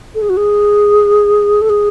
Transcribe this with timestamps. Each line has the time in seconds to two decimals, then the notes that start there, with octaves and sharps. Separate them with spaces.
0.15 A4
0.22 G#4
0.29 F#4
0.37 G#4
1.62 A4
1.70 G#4